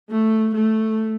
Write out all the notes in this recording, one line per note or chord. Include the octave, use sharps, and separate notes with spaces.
A3
A3